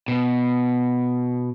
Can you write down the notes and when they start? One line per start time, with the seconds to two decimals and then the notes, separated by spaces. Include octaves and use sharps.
0.08 B2